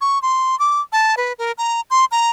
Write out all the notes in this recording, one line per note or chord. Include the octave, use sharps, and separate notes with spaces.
C#6
C6
D6
A5
B4
A#4
A#5
C6
A#5